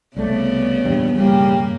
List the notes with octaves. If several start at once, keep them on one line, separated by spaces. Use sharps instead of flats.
C2 C#3 A3 B3 D5
E2 G2 A#2
E1 G2 C#3 F3 G3 A#3